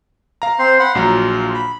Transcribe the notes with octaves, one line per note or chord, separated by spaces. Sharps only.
F5 A#5
C4 C5 C6
F#5 B5 C6
A#1 F#3 F4 A#5
B5